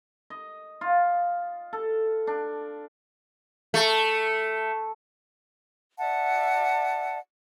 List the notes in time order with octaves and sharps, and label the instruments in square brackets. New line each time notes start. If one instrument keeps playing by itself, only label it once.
[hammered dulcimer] D#5
F4
A4
D4
[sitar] A3
[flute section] D5 E5 F#5 A5